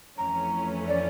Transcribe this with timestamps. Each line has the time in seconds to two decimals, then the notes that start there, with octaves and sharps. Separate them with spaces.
0.18 F2 E3 A3 C#4 A#5
0.88 D5